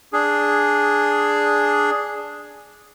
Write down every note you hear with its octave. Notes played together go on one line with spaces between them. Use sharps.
D4 G#4